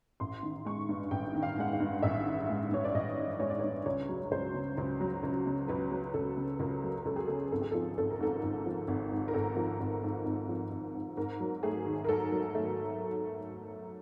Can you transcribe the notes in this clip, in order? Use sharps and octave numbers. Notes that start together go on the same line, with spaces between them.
A1 C6
D#3
G#3 C#6
G2
A1 G5
D#3
F5
G#3 F#5
F5
G2
A1 E5
D#3
G#3
G2 C#5
D5
A1 D#5
D#3
G#3 C#5
D5
G2 C#5
C#2 C#5
F#3
C#2 C5
C#3
C#2
F#3
C#2
C#3
C#2 B4
F#3
C#2 A4
C#3
C#2 A#4
F#3
C#2 A4
G#4
C#3 A4
G#1 A4
G#4
F3 A4
G#1 A4
A#4
G#2 A4
G#1
F3
G#1
G#2
A#4
G#1 A4
F3
G#1
G#2
G#1
F3
G#1
G#2
G#2 A#4
F#3
A3 G#4
D#3
A#4
G#2 A4
F#3
A3